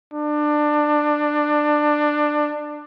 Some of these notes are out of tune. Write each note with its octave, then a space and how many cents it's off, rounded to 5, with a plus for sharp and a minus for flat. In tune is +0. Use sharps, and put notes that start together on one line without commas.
D4 +20